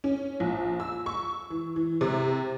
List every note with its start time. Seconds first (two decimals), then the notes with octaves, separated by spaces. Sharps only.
0.04 C#4
0.40 A#1
0.80 E6
1.06 C#6
1.50 E3
1.76 E3
2.01 C3